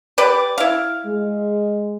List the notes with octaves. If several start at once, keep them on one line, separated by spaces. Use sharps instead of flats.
G4 B4 D5
E4 F5
G#3